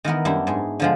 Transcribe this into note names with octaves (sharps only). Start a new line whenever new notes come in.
D#3 E3 B3 A#4
F#2 G3 D4 E4
G#2 G#4
D3 F3 G#3